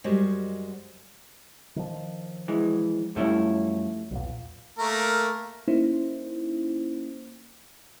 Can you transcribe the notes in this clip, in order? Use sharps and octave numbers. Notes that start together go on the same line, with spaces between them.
F#2 G3 G#3 F#4 C5 D#5
D#3 F3
E3 G#3
F#2 F3 G3 A3 C#4 E4
B1 E2 A#2
A3 A#3 A#4
A#3 C#4 D#4 E4 C5